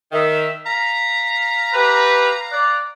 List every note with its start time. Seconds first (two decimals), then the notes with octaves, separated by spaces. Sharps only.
0.12 D#3 E5
0.66 F5 A#5 B6
1.74 G4 B4
2.52 D5 F#6